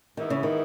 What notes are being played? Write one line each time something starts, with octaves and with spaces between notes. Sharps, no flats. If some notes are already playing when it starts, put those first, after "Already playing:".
G#2 D#3 E3 B3 E4
C#3
D#3